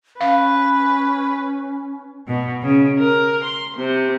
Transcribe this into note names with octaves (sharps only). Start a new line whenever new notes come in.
C#4 B4 F5
B2
C#3
A#4
C6
C3